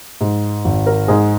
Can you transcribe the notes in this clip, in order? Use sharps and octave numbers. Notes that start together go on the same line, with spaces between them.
G#2
G#1
A#4
G#2 G#4